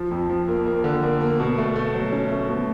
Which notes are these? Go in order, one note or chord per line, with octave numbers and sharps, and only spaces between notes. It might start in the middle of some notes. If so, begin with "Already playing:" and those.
Already playing: F3
F2
F3
A#3
A#3
D3
A#3
A#3
B2
A3
A3
F#3
C#4
A3
B2